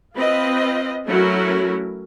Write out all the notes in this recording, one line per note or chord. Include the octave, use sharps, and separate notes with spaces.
C4 F4 B4 D#5
F#3 A3 C#4 E4 F#4 A#4